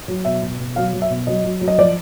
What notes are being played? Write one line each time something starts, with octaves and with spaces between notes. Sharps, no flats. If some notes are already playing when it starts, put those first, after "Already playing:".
F#3
B2 E5
B2
B2
F#3 F5
F#3
E5
B2
F#3 D#5
F#3
F#3
D#5
F3 D5